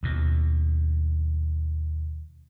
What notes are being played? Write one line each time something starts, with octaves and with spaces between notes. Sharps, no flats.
D#2 B2